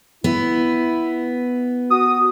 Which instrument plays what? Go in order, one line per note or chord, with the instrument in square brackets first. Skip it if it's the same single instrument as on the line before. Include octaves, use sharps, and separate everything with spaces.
[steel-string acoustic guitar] B3 [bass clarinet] E4
[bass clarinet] F#4 [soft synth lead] D#6